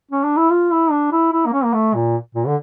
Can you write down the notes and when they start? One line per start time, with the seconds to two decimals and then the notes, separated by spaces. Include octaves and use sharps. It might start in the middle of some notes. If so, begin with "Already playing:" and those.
0.11 C#4
0.24 D4
0.37 E4
0.50 F4
0.71 E4
0.91 D4
1.12 E4
1.33 E4
1.46 A#3
1.53 C#4
1.63 A#3
1.73 A3
1.94 A#2
2.35 A#2
2.47 D3